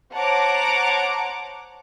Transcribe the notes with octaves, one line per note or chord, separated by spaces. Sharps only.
C5 C#5 F#5 A5 A#5 D6